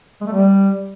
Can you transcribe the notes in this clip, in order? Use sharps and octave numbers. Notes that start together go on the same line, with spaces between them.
G#3
A3
G3